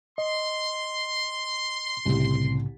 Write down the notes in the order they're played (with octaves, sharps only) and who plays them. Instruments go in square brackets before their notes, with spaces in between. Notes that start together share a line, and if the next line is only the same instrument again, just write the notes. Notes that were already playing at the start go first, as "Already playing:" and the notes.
[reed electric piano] D#5 [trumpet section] C6
[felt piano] C2 [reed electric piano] A2 C#3